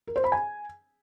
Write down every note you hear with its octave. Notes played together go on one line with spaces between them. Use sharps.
A#4
C5
B5
G#5